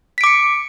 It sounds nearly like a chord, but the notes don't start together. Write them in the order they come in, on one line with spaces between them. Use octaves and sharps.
B6 D7 D6 C#7